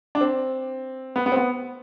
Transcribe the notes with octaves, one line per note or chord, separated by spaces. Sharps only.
D4
C4
B3
B3
C4
B3